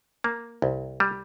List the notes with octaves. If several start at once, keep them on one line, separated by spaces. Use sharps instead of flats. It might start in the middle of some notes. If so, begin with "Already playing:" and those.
A#3
C2
G3